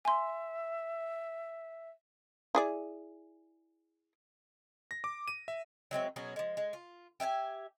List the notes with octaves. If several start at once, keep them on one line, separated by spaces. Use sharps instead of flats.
E5 G#5 C6
E4 G#4 D5
A#6
D6
D#7
E5
F#3 G#3 C4 E5
B2 F#3 C#4 G#4
F3 G#3
G#3
F4
G4 E5 F#5 G#5